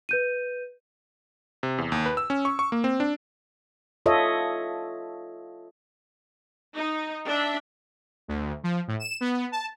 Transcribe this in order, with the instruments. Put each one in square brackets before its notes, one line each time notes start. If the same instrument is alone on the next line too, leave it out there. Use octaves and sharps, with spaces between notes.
[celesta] B4 G6 D#7
[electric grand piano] C3
E2
D#2
B4
E6
C#4
C#6
C#6
A#3
C4
D4
[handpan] F4 A4 C#5 D#5 E5
[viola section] D#4
D4 E5
[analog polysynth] D2
F3
A2
E7
B3
A5